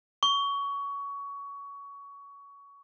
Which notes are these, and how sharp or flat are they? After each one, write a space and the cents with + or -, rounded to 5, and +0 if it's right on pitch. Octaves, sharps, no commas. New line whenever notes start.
C#6 +20